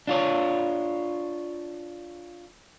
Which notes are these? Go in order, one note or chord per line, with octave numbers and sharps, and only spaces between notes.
D4 F4 C#5